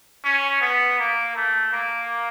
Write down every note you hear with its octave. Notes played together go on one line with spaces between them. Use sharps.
C#4
B3
A#3
A3
A#3